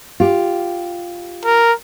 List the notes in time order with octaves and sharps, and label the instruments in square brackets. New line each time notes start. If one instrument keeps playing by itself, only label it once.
[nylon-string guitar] F4 G4
[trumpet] A#4